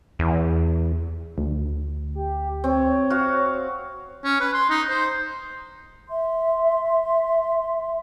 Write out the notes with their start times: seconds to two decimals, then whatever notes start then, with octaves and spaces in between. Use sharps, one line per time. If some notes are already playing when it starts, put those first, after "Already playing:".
0.19 E2
1.38 D2
2.15 G4
2.64 C4 C#5
3.10 F#4 F5
4.24 C#4
4.40 B4
4.54 C6
4.70 D#4
4.90 C5
6.08 E5 C6